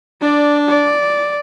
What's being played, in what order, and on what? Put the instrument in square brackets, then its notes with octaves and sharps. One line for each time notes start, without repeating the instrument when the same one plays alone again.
[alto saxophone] D4 [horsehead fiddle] D5
[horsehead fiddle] D5